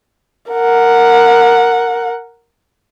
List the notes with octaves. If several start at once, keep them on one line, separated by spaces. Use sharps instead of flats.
A#4 F#5